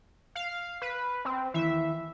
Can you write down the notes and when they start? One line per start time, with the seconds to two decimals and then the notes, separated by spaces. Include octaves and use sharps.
0.35 F5
0.82 B4
1.25 C4
1.54 D#2 E3 E5